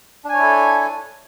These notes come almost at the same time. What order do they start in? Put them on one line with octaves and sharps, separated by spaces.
D4 G#5 C#5 E4 A4